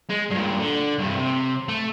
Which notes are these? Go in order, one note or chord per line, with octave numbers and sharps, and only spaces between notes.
G#3
G2 A#2
D3
G2 C3
C3
A3